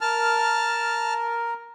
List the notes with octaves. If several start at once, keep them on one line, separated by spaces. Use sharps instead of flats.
A#4 A5 F6